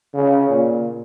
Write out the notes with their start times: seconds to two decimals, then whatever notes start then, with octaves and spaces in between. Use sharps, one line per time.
0.14 C#3
0.49 A#2